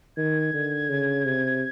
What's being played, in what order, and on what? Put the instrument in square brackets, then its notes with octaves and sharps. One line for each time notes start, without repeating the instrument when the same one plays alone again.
[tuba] D#3 [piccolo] G#6
[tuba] D3
C#3
C3